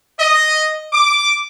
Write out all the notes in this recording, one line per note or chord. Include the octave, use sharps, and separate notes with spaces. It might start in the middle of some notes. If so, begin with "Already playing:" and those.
D#5
D6